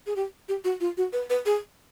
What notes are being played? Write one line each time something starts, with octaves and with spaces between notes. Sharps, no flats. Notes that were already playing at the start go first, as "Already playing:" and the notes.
G#4
G4
G4
F#4
F4
F#4
B4
B4
G#4